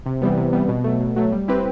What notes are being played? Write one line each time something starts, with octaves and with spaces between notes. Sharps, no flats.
C3
E3 G3 B3
C3
E3 G3 B3
B2
F#3 A3
B2
F#3 A3
G3
C4 E4 G4 B4